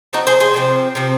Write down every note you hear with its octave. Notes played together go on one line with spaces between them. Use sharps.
F3 C4 D#4 F#4
G#4 C5
G#4 C5
C3 F3 C4
C3 F3 C4